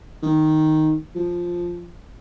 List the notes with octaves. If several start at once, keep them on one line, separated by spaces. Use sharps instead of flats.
D#3
F3